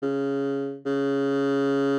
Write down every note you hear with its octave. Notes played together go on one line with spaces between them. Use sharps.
C#3
C#3